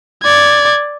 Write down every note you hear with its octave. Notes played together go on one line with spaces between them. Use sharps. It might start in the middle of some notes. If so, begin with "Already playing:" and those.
D5 G#6